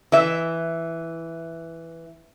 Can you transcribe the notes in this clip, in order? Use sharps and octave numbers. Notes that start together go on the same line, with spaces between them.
E3 E5